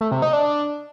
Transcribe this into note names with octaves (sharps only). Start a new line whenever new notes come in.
A3
C3
D#4
D4